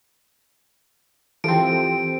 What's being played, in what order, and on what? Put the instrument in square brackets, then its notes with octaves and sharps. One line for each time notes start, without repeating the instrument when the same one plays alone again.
[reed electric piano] E3 G4 A4 [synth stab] F3 C4 [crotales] D7